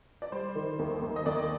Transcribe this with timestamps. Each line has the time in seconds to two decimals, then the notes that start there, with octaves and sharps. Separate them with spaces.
0.22 D5
0.32 G3 C5
0.55 D#3
0.79 D#2
1.02 D#2
1.16 D#5
1.26 D#2 D5